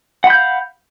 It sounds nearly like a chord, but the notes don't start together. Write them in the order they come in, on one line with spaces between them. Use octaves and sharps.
F#5 B5 G6 F5